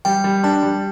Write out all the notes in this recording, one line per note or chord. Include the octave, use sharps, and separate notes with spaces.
G3 G5
G3
D4 A5
G3